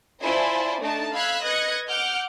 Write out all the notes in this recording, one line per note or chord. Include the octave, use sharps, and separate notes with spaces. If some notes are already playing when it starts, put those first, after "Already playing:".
E4 F4 C5 D5 G#5 A5
A3 D4 D#4 A5
F5 B5 E6 F#6 G#6
B4 D#5 F#6 G#6 A#6 C#7
F#5 D6 F6 G6